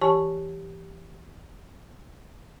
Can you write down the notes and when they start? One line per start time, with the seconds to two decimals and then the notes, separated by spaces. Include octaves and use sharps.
0.01 E3 G4 C#5 G#5 A5 C#6